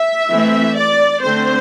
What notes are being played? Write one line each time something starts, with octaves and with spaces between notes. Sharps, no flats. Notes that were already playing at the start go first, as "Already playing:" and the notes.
Already playing: E5
E3 A3 C4
D5
D3 A3 C4 C5